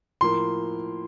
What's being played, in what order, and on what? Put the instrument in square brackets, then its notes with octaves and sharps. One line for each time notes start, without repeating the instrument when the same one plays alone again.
[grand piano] A2 F3 A#3 C6